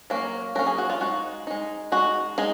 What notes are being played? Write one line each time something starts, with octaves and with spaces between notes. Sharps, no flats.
F#3 A#3 C#4
F#3 A#3 C#4 A#4
G#4
F#4
F4
G#3 D#4 F#4
G#3 D#4
G#3 D#4 F#4
G#3 D#4 G#4